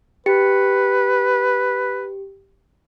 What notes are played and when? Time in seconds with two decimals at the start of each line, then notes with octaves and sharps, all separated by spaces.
0.26 G4 B4 C#7